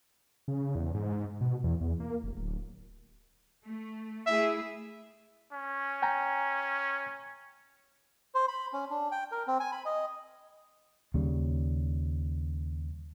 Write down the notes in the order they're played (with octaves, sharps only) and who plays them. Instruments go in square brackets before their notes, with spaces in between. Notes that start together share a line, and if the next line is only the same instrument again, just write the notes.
[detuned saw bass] C#3
E2
G#2
B2
E2
E2
A#3
F1
D1
[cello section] A3
[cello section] A3 E4 G#4 [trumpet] E5
[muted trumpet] C#4
[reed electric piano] G5 G#5 A#5
[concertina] C5
B5
C#4
D4
G5
A#4
C4
G#5
B5
D#5
[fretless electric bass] D#2 C#3 G3